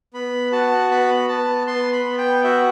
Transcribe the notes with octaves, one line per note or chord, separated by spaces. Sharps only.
B3 B5
F#4 A5
B3 B5
B3 A5
B3 C6
B5
B3
G5
F#4 E5